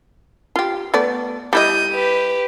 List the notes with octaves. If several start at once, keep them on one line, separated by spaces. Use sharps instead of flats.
F4 G4
A3 B3 D5
G3 E4 D#5 G6 D#7
G4 B4